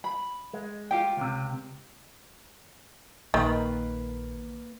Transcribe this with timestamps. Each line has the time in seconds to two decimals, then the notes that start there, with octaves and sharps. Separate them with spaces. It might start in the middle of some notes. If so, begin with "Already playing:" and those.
0.04 B5
0.53 G#3
0.91 F4 G4 G5
1.17 C#2 C3
3.34 A#1 D#3 A#3 B4